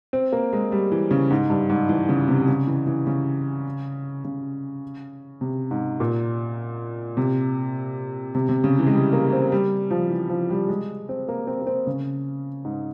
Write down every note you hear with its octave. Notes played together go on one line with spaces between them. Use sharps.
C4
A#3
G#3
G3
E3
C#3
G#2
G2
G#2
E3
C#3
C3
C#3
E3
E3
C#3
C#3
C3
G#2
A#2
C3
C3
C3
C#3
E3
G#3
G3
A#3
C4
G3
F3
E3
F3
G3
G#3
C4
A#3
C4
A#3
C4
C#3
G#2